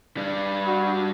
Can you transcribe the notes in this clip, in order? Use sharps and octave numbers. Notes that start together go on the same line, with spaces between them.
G3 D4
F#4